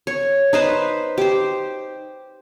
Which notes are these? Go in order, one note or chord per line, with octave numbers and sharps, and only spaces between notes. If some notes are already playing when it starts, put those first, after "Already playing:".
C#5
D#4 B4 C5
G4 C5